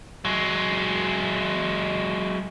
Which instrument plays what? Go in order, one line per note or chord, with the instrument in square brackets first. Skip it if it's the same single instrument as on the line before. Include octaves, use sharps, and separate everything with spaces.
[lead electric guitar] F#3 G#3